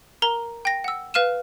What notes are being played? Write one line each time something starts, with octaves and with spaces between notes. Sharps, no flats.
A#4 A#5 G7
G5 A#6
F#5 E6
B4 F5 F6 D#7 E7